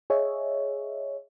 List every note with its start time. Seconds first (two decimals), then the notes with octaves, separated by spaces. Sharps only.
0.10 G#4 C#5 D#5 E5